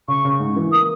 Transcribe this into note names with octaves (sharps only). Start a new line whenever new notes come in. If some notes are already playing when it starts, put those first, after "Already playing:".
C#3 C#6
C#3
G#2
E3
A#3 D#6